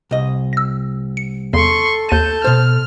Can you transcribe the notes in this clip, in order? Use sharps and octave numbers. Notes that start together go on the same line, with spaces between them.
C2 D#5
E6 A#6
C#7
E2 C#3 A4 C6 C#6
D#2 A5 G6 A6 D#7
B2 C5 F6